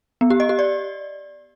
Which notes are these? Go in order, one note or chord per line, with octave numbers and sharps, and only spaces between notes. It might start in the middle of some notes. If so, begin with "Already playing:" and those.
B3
G4
D#5
G4
D5